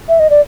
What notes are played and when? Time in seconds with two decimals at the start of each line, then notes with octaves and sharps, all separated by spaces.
0.09 E5
0.20 D#5
0.30 D5